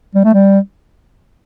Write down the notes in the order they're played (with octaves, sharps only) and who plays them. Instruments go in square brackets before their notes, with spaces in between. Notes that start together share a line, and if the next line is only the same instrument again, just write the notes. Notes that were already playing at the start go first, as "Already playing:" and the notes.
[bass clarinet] G3
A3
G3